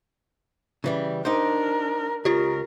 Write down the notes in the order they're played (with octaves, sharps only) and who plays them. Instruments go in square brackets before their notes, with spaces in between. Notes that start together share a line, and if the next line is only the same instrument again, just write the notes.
[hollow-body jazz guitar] C#3 E3 G3
[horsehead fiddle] D4 A#4 [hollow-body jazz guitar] D#4 G4 C5
[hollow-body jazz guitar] C#2 C#5 [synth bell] F4 G4 [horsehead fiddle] A#4